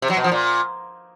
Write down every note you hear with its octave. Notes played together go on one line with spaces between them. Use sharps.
C3
F#3
B2
F3
A#2